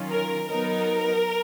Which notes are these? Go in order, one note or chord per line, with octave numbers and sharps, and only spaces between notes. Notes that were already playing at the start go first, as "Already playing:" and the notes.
Already playing: D#3 F#3 C#4 F4
A#4
F#3 B3 D#4 A#4